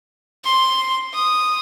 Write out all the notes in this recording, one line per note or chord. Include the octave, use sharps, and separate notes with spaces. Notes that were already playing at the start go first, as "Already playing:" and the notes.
C6
D#6